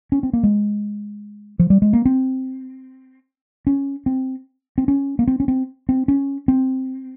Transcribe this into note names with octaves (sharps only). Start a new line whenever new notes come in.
C#4
C4
A#3
G#3
F3
G3
G#3
A#3
C4
C#4
C4
C4
C#4
A#3
C4
C#4
C4
C4
C#4
C4